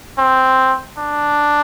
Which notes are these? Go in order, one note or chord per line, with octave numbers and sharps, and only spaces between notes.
C4
D4